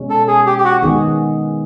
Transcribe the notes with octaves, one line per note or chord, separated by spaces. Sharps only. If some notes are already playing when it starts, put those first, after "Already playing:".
Already playing: B2 G#3 C#4
A4
G#4
G4
G4
F#4
D#3 G#3 B3 D#4 G#4